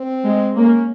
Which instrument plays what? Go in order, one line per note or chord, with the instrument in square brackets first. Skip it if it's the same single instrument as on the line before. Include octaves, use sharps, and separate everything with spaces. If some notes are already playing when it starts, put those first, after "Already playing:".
Already playing: [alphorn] C4
[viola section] G#3
[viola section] A#3 [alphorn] C#4